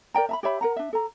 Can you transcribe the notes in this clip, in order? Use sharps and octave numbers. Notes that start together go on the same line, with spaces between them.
A#4 D5 G5 A#5
E5 A#5 B5
G4 C#5 E5 B5
A#4 F#5 A#5
D4 E5
A4 A#5